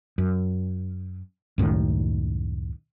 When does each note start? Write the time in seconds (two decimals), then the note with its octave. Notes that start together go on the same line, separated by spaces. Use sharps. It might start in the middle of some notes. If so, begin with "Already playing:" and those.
0.18 F#2
1.58 C#2 F#2 A2 D#3